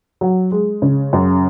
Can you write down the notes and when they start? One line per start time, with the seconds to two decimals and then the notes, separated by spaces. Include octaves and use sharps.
0.21 F#3
0.52 G#3
0.82 C#3
1.13 F#2